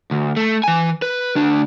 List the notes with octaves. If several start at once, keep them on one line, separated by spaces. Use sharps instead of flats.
D2
A3
E3 G#5
B4
D2 D4